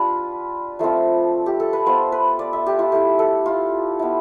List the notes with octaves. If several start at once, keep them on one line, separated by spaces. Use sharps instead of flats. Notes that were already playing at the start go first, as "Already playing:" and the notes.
Already playing: G3 D4 F4 B4
F3 A3 C4 F4
G4
A4
B4
B3 F4 C5
B4
D5
E5
G4
F4
A3 E4 G4
A4
F4
B3 E4